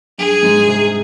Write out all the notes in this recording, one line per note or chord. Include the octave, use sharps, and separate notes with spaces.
G2 G#4
G#2
C3